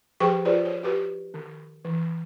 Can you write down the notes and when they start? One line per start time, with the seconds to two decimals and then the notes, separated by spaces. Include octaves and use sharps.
0.20 F3 G4 G#4 C5 G5 C#6
0.45 F4 G#4 B4 C5 D5
0.65 C#5
0.83 F#4 G4 B4
1.34 D#3
1.85 E3